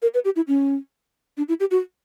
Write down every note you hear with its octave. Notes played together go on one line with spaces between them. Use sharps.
A#4
B4
G4
E4
C#4
D4
E4
G4
F#4